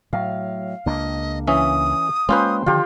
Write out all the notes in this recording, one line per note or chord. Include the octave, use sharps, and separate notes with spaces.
A2 F#3 F5
C#2 A#3 D4 D#5
E3 C#4 E5 D#6
G#3 A#3 C#4 F4 B4 C5 G5 C6
D3 D#3 F3 F4 G4